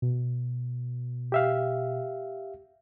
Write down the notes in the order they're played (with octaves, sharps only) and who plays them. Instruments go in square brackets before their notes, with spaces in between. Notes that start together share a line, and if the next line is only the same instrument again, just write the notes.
[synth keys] B2
[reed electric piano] G4 E5 F5